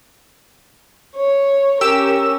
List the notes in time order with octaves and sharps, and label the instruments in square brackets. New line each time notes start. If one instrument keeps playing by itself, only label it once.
[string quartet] C#5
[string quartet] C#4 A#4 [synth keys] G4 E6 E7